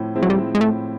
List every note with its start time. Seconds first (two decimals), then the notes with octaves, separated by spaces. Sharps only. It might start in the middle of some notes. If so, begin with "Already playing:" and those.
Already playing: A2 F3 C4 E4
0.15 F3 G#3 C4 E4
0.23 F#3
0.30 G3
0.55 G#3
0.61 A2 A3